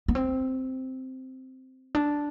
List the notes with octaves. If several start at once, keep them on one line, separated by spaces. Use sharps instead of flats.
B3
C4
D4